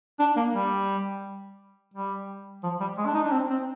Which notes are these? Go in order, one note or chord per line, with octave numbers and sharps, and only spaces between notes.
D4
A#3
G3
G3
F3
G3
G#3
D4
D#4
D4
C4
C4